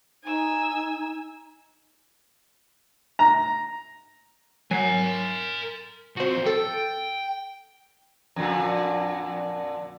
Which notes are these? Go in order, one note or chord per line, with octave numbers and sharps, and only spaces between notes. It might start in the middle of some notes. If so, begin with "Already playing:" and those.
D#4 G#5 E6
A#5
F#3 A#4 G#5
F3 C4 F#4 C5
A4 G5
F2 A#2 D3